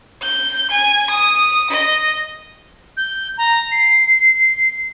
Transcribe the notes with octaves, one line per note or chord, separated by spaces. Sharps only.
G6
G#5
D#6
D#5
G6
A#5
C7